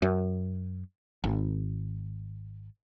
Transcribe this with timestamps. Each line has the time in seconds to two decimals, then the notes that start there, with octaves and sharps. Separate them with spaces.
0.02 F#2
1.24 G#1